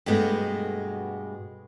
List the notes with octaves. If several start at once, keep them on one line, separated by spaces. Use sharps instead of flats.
G2 B2 G#3 A3 B3